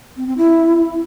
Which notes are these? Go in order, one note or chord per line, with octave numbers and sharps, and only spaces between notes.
C4
C4
E4